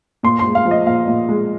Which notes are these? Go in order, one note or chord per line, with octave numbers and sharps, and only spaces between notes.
A#2 C6
C6
G#3
F5
F3
D#5
A#2 F5
A#2
G#3